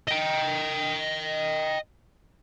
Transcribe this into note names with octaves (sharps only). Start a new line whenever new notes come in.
D#5 G5